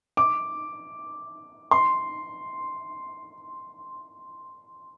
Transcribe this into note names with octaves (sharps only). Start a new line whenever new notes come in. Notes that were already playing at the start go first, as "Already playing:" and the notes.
D6
C6